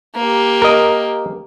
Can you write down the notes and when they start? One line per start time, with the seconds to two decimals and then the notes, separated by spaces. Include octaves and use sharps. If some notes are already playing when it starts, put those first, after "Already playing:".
0.16 A#3 G4
0.62 A#4 D#5